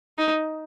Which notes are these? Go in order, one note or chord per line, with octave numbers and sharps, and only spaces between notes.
D#4